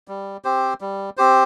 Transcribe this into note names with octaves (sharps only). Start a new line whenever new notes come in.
G3
C4 G4 C5
G3
C4 G4 C5